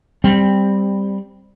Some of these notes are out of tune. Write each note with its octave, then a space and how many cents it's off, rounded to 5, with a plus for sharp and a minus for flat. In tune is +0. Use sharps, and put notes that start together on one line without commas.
G3 +10 C4 +0